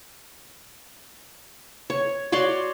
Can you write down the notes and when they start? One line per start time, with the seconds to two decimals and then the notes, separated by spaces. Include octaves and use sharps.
1.90 C#5
2.32 F#4 C#5 D5 C6